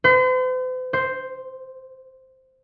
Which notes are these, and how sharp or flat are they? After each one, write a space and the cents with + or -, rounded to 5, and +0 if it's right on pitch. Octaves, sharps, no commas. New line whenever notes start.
C5 -45
C5 +0